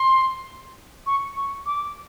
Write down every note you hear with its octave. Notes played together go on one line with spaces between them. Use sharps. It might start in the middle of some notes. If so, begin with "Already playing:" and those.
Already playing: C6
C#6
C#6
D6